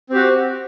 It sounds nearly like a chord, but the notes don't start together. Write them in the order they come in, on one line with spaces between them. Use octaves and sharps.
C4 G4 F#4